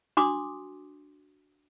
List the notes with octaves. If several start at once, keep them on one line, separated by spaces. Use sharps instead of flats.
D4 F#4 C6 D6 D#6